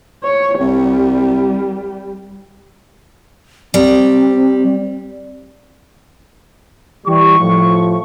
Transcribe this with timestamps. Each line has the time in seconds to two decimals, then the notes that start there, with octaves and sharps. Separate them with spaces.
0.23 C#5
0.60 C2 G3
3.74 G3 C4
7.07 E3 G3 C#6
7.40 A2 F3